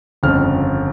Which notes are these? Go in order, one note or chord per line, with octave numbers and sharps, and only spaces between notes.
G1 F2 C#3 F6